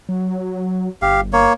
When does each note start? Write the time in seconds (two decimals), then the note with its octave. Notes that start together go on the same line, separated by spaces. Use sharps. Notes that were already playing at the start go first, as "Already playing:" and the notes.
0.09 F#3
1.02 G1 G4 F5
1.33 A#3 C#5